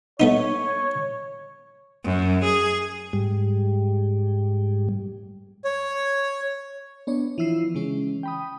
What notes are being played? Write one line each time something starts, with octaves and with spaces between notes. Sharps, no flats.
A3 B3 D#4 C#5
F#2
G#4
G#2 G3
C#5
B3 D4 C#5
E3 F3 E4 E6 C7
C#3 E3 G#3 C#4
G5 B5 D#6